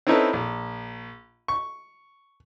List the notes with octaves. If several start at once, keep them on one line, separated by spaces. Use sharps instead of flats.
C4 C#4 D#4 E4 A4 B4
A#1
C#6